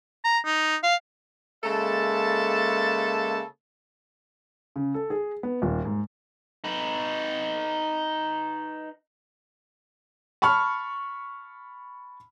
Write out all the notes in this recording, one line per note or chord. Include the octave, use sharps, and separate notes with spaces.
A#5
D#4
F5
C#3 G#3 A#3 A4 E5 A5
C#3
A4
G#4
B3
D#1
G#2
D#4 B4
A5 B5 C#6 F6